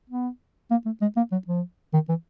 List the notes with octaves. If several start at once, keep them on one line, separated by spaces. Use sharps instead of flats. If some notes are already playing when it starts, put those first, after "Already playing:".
B3
A#3
A3
G#3
A#3
F#3
F3
D#3
E3